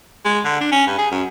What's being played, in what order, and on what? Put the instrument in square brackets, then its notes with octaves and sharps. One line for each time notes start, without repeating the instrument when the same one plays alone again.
[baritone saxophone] G#3
D3
D4
C#4
G2
G#4
F#2